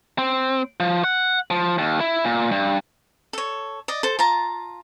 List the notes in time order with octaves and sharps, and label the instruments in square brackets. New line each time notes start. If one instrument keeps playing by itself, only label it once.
[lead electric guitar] C4
F3
F#5
F3
D#2
E4
A#2
G2
[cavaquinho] A4 C#5
D5 D#5
A4 C5
F4 A5 A#5